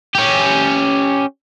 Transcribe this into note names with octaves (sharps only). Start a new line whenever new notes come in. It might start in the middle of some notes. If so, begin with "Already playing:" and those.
C#4 G4